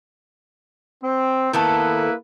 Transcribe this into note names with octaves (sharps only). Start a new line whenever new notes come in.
C4
D#3 A#3 B3 E4 A4 B4